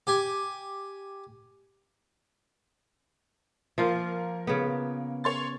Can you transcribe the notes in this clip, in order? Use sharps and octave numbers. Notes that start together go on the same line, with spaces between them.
G4 G#5
F3 A#3 F4 A#4
C#3 B3
C#5 C6 A6